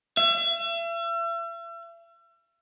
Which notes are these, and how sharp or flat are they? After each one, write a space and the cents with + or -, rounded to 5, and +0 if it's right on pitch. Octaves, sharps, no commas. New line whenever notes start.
E5 +40